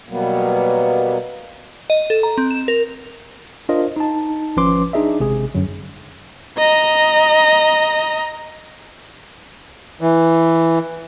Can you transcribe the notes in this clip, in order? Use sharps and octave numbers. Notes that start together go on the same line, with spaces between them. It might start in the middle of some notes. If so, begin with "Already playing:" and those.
B2 F#3 G3 A#3 B3
D#5
A4
A#5
C4
E7
A#4
D4 F4 A#4 C5 D#5
D#4 A5
G#1 F3 C#4 B4 C6 D6
D4 D#4 G#4 D#5 E5
G#1 C3 G#3 G#4
F#2 D3 F#3
D#5 A#5
E3